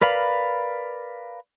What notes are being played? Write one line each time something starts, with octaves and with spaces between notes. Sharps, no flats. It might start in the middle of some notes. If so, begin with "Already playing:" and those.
A#4 B4 D5 F5 B5